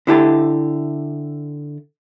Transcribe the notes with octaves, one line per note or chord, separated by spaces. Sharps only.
D3 E4 G4 A4